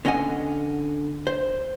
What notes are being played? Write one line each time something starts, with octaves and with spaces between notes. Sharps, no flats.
D3 C#4 D#5 F#5 G#5
C5